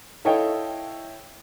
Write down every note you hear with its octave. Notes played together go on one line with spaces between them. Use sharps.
E4 A4 C#5 D#5 F5 G5